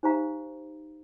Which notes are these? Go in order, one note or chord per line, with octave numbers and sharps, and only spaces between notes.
D#4 G4 C5 F5 A#5